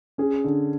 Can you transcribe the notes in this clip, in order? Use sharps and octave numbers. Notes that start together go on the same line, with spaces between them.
C#4 G#4
D3